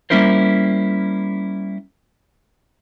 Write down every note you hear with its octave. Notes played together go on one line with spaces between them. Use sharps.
G3 A#3 C#4 E4 A#4 C5